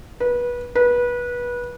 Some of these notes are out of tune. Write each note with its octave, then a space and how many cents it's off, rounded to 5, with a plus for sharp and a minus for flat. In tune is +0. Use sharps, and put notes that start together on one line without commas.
B4 -25
B4 -25